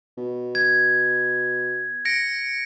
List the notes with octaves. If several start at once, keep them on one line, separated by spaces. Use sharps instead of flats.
B2
G#6
A#6 C#7 D7